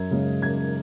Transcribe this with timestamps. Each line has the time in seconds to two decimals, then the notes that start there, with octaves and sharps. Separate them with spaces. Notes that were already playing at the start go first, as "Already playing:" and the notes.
Already playing: F#2 G#6
0.11 C#3 G#3
0.42 F#2 G#6